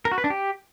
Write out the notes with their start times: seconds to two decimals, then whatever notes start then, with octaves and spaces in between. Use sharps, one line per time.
0.05 A#4
0.12 F#4
0.18 B4
0.24 D4
0.30 G4